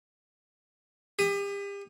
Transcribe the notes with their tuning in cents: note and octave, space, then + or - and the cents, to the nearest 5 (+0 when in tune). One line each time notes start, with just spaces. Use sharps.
G4 +35 D#6 -5